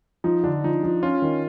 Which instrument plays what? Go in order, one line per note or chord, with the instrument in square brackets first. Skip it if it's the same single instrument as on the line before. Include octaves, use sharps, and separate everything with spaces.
[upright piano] F3 [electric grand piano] D#4
[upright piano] D3 [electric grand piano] D4
[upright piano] F3 [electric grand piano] D#4
[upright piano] F3
[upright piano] C#4 [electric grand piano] F4
[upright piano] D#3